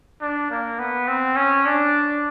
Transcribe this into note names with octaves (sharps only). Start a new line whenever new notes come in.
D4
A#3
B3
C4
C#4
D4